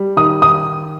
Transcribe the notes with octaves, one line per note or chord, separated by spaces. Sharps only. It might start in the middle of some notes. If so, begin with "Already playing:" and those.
Already playing: G3
D#3 D#6
D#6